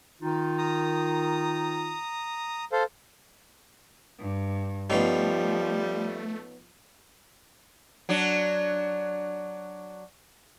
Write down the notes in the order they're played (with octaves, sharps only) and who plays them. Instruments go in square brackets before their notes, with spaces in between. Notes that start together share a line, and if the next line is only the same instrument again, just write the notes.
[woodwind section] D#3 D#4 F4
[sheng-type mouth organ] A#5 D#6
A4 C5 F5
[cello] G2
[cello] F3 [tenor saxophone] G3 [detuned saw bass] A3 [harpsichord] B3 C#4 D#4
[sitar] F#3 D4